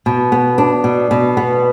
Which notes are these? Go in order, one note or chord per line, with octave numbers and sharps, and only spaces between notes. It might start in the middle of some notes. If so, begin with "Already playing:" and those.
B2
B3
D4
B2
B2
B3